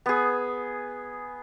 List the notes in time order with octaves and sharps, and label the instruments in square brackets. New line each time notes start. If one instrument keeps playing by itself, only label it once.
[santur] B3 G#4